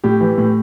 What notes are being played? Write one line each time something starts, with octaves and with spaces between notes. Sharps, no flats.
A2 G4
E3
A2